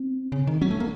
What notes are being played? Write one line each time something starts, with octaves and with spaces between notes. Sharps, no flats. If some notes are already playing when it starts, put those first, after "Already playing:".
Already playing: C4
C#3
D#3
F#3 C#4
A3
A#3